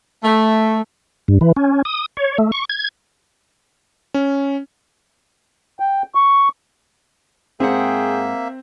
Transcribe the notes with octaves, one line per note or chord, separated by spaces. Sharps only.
A3
G2
E3
C#4
D#6
C#5
A3
C#6
G#6
C#4
G5
C#6
G#2 A#3 C4 G#4 E5 F#5 G5